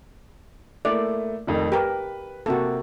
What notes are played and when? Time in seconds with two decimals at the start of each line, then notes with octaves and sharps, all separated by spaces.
0.85 A3 A#3 E4 D5
1.47 F1 F2 D#3
1.72 G4 A#4 B4
2.46 C3 A#3 F#4 A4